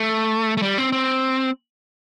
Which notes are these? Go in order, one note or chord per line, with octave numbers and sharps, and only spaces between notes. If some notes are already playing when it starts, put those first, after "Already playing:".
Already playing: A3
A3
G3
C4
C4